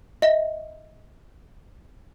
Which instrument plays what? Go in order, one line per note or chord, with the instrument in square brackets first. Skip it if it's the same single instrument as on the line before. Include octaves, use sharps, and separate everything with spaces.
[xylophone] D#5 E5